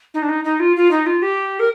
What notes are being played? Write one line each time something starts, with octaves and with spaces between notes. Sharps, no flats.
D#4
D4
D#4
D#4
F4
F4
D#4
F4
G4
A#4